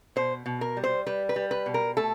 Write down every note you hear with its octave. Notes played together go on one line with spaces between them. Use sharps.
B2 C5
B2
A#4
G3
C5
G3 B4
B4
G3
B4
B2
A#4
A3 A4